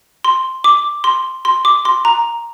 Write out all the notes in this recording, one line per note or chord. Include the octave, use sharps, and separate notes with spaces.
C6
D6
C6
C6
D6
C6
A#5